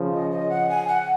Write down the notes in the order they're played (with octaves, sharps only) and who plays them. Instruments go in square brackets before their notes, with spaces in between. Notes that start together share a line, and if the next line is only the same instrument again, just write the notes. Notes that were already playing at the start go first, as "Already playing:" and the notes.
Already playing: [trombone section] C#3 F3
[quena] D#5
D#5
F#5
G#5
F#5